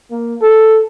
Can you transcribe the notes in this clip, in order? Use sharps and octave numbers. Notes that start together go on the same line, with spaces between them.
A#3
A4